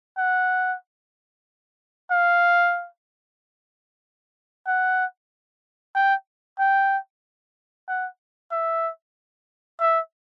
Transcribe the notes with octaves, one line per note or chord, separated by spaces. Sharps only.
F#5
F5
F#5
G5
G5
F#5
E5
E5